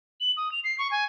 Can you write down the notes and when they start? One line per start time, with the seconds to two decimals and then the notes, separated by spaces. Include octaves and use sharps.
0.21 F#7
0.37 D#6
0.52 F7
0.64 C7
0.79 C#6
0.91 G#5